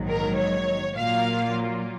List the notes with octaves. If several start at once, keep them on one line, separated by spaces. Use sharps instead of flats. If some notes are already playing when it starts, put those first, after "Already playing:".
Already playing: A#1 G#2 D#3 F#3
A#4
C#5
A#2 F#3 A#3 F4 F5